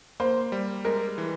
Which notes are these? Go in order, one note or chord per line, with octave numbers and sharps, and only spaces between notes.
A#3 C5
G3
G#3 A#4
E3